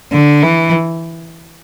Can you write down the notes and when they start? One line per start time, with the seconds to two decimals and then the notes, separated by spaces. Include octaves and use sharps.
0.12 D3
0.43 E3